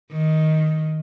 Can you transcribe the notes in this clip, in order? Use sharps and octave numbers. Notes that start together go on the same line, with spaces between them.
D#3